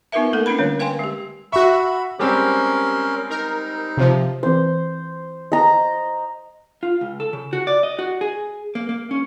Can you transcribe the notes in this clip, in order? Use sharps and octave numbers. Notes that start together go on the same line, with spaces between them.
B3 D#4 F4 A#4 B4 E5
A3 A#3 A4 A#4
C#4 D4 F4 B4 B5
D3 G3 C#5
B4 F5 G5 G#5 C6
G#3 G4
F#4 E5 B5 C#6
G3 G#3 C4 C#4 G4 A#4
D#4 A#4
C3 F3
E3 C4 B4 C5
D#5 A#5
F4
C#2
A4
C#3
F#4
D5
D#5
F#4
G#4
A#3
A#3
C#4